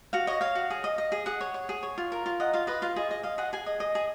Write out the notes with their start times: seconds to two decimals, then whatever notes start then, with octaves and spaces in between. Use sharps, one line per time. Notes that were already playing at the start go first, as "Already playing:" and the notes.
0.13 F#4 F5
0.27 C#5 D#5
0.41 C#5 F5
0.55 F#4
0.70 G#4
0.84 D#5
0.98 D#5
1.12 G#4
1.26 G#4 F#5
1.41 C#5
1.54 C#5
1.69 G#4
1.83 C#5
1.98 F4
2.12 A#4
2.26 F4
2.40 D#5 F#5
2.53 F4 F5
2.67 B4 D#5
2.82 F4 F5
2.96 G#4 D#5
3.11 D#5
3.23 D#5 F5
3.38 G#4 F#5
3.53 G#4 G#5
3.66 D#5
3.80 D#5
3.95 G#4